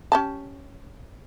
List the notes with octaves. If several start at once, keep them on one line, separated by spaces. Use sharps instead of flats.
C#4 G4 A5